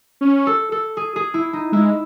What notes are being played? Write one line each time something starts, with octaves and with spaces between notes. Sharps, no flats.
C#4
A4
A4
G#4
G#4
E4
D#4
G#3 E4